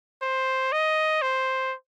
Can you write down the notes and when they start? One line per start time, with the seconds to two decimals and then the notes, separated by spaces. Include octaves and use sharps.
0.22 C5
0.72 D#5
1.22 C5